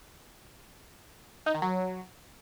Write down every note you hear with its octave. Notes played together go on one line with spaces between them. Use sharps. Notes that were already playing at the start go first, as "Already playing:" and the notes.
D#4
D#3
F#3